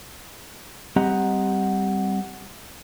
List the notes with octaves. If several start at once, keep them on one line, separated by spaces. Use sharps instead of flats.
G3 C4 G4 D#5 F#5 A#5